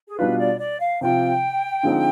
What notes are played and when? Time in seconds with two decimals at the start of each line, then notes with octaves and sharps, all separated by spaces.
0.08 G#4
0.18 B2 G3 D4 F4 B4
0.39 D5
0.60 D5
0.80 F5
1.01 C3 F3 C4 F4 G5
1.83 D3 F3 G#3 C4 D#4